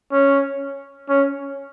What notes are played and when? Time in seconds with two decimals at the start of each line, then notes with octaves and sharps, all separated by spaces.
0.12 C#4
1.09 C#4